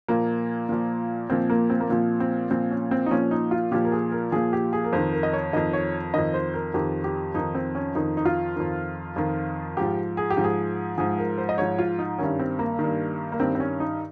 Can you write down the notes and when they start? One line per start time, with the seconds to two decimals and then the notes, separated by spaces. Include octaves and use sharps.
0.08 A#2 F3 A#3
0.69 A#2 F3
1.30 A#2 F3 C4
1.50 A#3
1.70 C4
1.80 A#3
1.90 A#2 F3 C4
2.20 C4
2.51 A#2 F3 C4
2.71 C#4
2.91 C4
3.06 D#4
3.11 A#2 F3 C#4
3.31 D#4
3.51 F4
3.71 A#2 F3 G4
3.85 A#4
3.92 G#4
4.12 A#4
4.32 A#2 F3 G#4
4.53 G4
4.73 G#4
4.84 A#4
4.93 F2 D#3 C5
5.13 A#4
5.23 D#5
5.33 C#5
5.53 F2 D#3 D#5
5.73 C#5
6.14 F2 D#3 D#5
6.34 C5
6.54 A#4
6.74 F2 D#3 G4
7.04 G4
7.34 F2 D#3 D#4
7.55 C4
7.75 C#4
7.95 F2 D#3 D#4
8.17 D#4
8.25 F4
8.56 F2 D#3
9.16 F2 D#3
9.77 G#2 F3 G4
10.17 G#4
10.30 G4
10.37 G#2 F3
10.44 G#4
10.98 G#2 F3 G#4
11.18 A#4
11.38 C5
11.49 D#5
11.58 G#2 F3 C#5
11.79 F4
11.99 D#4
12.18 G2 D#3 C#4
12.39 C4
12.59 A#3
12.79 D#3
12.84 G2
13.32 A#3
13.40 G2 D#3 C4
13.55 C4
13.60 C#4
13.80 D#4